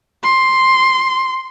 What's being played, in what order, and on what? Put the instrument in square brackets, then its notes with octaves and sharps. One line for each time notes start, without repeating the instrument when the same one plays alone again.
[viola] C6